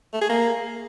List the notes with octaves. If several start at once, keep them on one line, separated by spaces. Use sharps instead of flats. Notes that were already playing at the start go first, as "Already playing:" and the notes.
A3
G#4
A#3